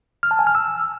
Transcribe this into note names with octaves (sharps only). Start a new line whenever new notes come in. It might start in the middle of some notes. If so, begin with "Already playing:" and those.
F6
A5
G#5
F6
E6